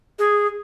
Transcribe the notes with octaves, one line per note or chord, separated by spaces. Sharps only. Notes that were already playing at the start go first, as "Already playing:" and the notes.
G#4